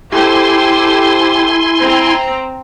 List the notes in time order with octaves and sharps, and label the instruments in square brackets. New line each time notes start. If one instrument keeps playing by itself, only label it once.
[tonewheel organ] E4 G#5 C6 [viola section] G4 A4 C5
[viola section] C4 A#5